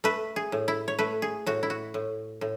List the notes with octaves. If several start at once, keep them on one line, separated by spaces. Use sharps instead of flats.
A3 B4
G#4
A2
E4
C#5
A3 B4
G#4
A2 F#4
E4
F#4
A2
A2